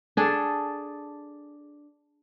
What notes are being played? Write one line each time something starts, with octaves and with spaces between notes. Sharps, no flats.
D4 G#4 A4